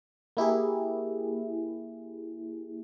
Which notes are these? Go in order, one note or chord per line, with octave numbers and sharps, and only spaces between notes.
A#3 E4 G4 G#4